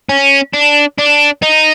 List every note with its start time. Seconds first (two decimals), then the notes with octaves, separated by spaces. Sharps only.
0.09 C#4
0.53 D4
0.98 D4
1.42 D#4